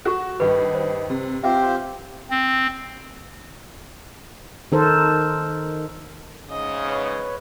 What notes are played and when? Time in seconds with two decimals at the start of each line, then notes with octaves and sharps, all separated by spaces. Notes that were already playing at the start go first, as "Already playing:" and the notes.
0.05 F#4 A4 F#5 C#6
0.40 G2 D#3 B4
0.75 C5
1.10 C3
1.44 C4 F4 G4 C5 E5
2.30 C4
4.72 D#3 D#4 A4 A#4 C5
6.50 G#2 C#3 D#5
6.86 B4 C#5